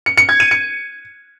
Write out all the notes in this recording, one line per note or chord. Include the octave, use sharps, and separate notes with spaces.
C#7
C#7
G#6
D#7
C#7